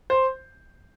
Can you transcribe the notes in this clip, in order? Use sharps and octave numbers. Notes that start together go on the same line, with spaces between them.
C5